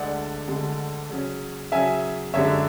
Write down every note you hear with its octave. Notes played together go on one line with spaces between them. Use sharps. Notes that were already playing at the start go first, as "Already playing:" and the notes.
Already playing: D2 D3 G#3 D5 F#5
D2 D3 G#3
C#3 F#3 C#4
C#3 F#3 C#4 E5 G#5
F#2 D3 G#3 D4 C#5 E5